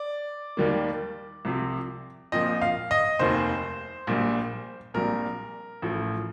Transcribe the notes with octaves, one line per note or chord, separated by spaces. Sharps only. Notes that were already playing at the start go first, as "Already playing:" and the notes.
Already playing: D5
D#2 D#3 G3 A#3
C2 C3 F3
A#1 A#2 F3 C4 D#5
F5
D#5
F1 D#2 D#3 C5
A#1 A#2 G3
A#1 A#2 G3 C4 A#4
A1 A2 F3 A3